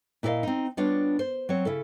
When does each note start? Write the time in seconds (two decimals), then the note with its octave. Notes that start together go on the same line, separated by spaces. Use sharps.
0.23 A#2 E4 F4 D5 D#5 F5
0.43 C4 D#4
0.77 G3 B3 D4 F4 C#5
1.19 C5
1.49 F#3 C4 C#5
1.65 C#3 E4 A4